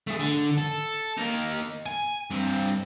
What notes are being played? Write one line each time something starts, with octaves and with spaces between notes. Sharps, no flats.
A3 G#4
D3
A4
A#3 D#4
G#5
G2 C4